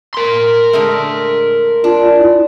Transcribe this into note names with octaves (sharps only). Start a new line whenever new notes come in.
A#4 C6
D3 G#3 A3
D4 F4
E4